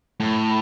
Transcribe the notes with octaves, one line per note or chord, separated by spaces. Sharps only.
A2